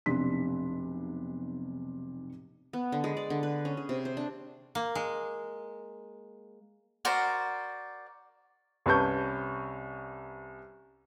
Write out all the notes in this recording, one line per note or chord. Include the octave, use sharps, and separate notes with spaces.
F1 B1 C3 D4 C6 B6
B3
D3
G#3
D5
D3
B4
C#4
G#4
C3
C5
D4
A#3
G#3
F#4 A#4 C5 D5
C2 C#4 B4 A5 C#6 G6